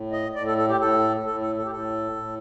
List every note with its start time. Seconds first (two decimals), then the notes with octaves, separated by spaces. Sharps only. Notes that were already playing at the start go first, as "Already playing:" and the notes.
Already playing: A2
0.12 D#5
0.35 A2 D5
0.47 A4
0.58 A4
0.69 G4
0.80 A2 A4
1.26 A2 A4
1.41 A4
1.57 A4
1.65 G4
1.71 A2 A4
2.16 A2